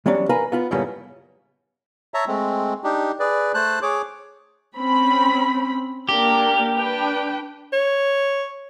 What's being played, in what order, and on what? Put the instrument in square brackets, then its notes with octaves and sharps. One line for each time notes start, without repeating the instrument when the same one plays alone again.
[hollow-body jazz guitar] E3 F#3 G3 B3 C#4 D4
A#4 B4 F5 G#5 A#5 B5
B3 F4 B5
F#2 A2 C#3 G3 A#3 B3
[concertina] C#5 E5 A5 A#5
G#3 A3 C4
D4 D#4 G4
G#4 B4 D5
A3 C5 A5 F#6
G#4 C#5 D6
[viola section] C4 C#4 B5
[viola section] A#3 D4 A#4 [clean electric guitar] G4
[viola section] D4 B4 G5
[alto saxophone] C#5